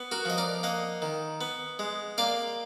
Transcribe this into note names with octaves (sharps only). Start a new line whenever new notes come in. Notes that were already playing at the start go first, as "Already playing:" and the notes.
Already playing: B3
F#4 A#4
F3 D#5
A#4 D5
A#3 D#5 F#5
D#3
B3
G#3
A#3 D5 F5